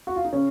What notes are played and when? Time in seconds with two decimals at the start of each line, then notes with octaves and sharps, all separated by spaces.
0.07 F#4
0.16 F4
0.25 D#4
0.33 C#3 C#4